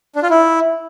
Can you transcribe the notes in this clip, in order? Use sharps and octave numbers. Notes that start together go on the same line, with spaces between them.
D4
F4
E4